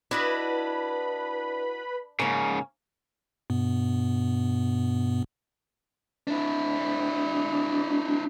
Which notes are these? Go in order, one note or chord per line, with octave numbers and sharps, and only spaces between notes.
D4 E4 F#4 B4 D#5 B5
G#2 C#3 A#3 C#4
G2 B2 B3
D4 E4